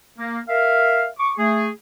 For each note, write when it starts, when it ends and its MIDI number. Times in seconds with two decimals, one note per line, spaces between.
0.18 0.40 58
0.49 1.07 70
0.49 1.07 76
0.49 1.07 77
1.19 1.32 85
1.19 1.32 86
1.38 1.69 57
1.38 1.69 68